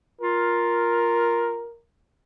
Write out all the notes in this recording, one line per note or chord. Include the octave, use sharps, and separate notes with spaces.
F4 A#4